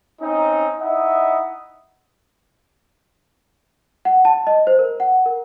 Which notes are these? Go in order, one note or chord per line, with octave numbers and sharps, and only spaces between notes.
C4 C#4 D#4
D#4 E4 D#5 E5 F#5
F#5
A5
D#5
C5
A#4
F#5
A#4